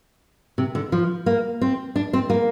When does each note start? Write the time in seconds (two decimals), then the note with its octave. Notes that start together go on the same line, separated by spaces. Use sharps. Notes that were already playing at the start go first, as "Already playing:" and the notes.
0.58 C3
0.75 D3
0.92 F3
1.26 A#3
1.61 C4
1.96 D4
2.13 C4
2.30 A#3